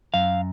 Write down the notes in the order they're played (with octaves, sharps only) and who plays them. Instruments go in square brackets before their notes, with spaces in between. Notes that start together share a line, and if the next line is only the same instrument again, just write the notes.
[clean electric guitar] F#2 F5